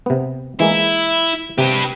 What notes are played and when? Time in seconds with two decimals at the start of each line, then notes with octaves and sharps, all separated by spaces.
0.06 C3 B3
0.60 E3 G#3 A#3 E4
1.58 C3 G4 B4